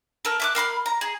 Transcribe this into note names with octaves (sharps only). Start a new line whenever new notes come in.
A4 A#4
E5 D6 F#6
A#4 F5 B5 C6
A#5
G#4